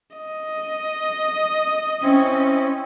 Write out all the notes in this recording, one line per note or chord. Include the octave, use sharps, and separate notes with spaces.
D#5
C4 C#4 E4